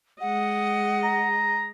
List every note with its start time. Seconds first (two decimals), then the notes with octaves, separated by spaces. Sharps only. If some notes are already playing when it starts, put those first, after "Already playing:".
0.21 G#3 D#5 F#5
1.03 A#5